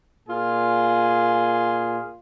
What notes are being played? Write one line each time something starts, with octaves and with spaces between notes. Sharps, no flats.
A#2 F4 G#4